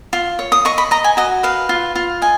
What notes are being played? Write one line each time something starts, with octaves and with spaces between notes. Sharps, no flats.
F4
C#5
D#6
D#5 C#6
B5
D#5 A#5
G#5
F#4 D#5
B4 F5
F4
F4
D#5 G#5